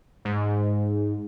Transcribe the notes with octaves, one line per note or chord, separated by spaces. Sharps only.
G#2